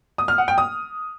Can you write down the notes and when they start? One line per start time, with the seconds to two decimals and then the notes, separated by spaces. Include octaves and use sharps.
0.18 D#6
0.28 F6
0.38 F#5
0.48 G5
0.58 D#6